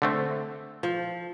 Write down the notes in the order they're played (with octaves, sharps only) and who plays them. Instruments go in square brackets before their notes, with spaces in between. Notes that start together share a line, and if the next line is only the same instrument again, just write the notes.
[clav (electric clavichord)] D3 A3 C4
[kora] F3